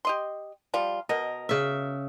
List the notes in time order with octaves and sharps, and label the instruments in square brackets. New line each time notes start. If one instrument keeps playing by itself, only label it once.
[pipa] G4 D#5 C6
F3 G3 F4
[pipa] B2 A#4 [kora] D#5
[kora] C#3 E5